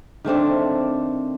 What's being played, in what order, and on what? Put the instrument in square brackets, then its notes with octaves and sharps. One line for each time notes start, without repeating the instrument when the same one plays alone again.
[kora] D#3 A3 C4 D4